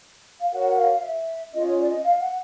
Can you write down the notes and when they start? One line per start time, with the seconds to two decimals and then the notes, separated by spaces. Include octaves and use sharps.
0.40 F5
0.52 F#4 A#4 C#5 F#5
0.69 F#5
0.77 F5
1.02 E5
1.52 C#4 F4 G#4 D#5
1.65 C#5
1.78 D5
1.90 D#5
2.03 F5
2.20 F#5